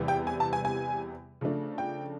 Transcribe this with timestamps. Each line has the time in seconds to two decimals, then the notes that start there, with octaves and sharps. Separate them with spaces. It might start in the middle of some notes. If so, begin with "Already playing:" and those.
Already playing: E2 C3 E3 G3 B3
0.08 G5
0.27 G#5
0.40 A5
0.53 G#5
0.65 G#5
1.41 C#3 F3 A3 D4
1.78 G5